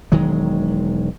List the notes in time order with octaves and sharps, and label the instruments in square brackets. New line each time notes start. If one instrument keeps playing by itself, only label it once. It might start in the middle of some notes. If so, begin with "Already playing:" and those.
[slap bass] E1 D#3 F#3 G#3